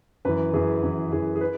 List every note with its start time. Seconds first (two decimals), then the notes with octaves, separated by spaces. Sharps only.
0.25 F#2 E3 B4
0.53 F#2 E3 G#4
0.83 F#2 E3
1.12 F#2 E3 G#4
1.36 G#4
1.41 B4